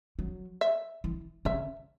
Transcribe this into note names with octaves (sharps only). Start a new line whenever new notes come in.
F#3
E5
E3
C#3 E5